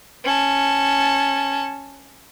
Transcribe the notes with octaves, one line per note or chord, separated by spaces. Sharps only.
C#4 A5